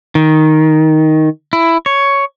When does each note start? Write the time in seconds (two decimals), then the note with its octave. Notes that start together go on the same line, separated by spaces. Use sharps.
0.15 D#3
1.53 E4
1.86 C#5